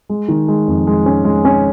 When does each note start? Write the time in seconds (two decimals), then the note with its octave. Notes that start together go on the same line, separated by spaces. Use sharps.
0.09 G#3
0.28 D#3
0.48 G#3
0.68 F2
0.87 G#3
1.06 C#4
1.25 G#3
1.45 C#4